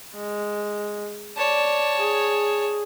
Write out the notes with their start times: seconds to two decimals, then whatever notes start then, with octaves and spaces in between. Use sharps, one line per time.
0.16 G#3
1.37 C#5 D5 A5
1.97 G#4